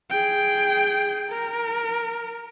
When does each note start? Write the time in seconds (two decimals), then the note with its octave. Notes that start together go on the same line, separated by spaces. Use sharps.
0.10 G#4 G5
1.29 A#4